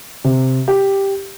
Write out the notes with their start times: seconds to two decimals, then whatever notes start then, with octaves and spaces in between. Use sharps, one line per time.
0.24 C3
0.68 G4